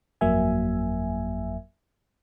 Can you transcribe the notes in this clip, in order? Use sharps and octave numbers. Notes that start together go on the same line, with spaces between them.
G1 F2 F#3 A#3 E5 G#5